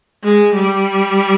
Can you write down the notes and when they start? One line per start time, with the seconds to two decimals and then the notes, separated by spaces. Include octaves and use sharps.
0.24 G#3
0.55 G3